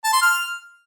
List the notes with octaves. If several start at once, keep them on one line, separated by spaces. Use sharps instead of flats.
A5
C6
F6